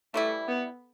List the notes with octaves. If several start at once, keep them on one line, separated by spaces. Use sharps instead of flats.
E3 G3 A3 E4
B3